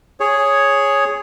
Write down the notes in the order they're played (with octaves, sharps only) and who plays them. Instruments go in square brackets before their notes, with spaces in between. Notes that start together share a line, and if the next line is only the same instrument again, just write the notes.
[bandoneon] G#4 C#5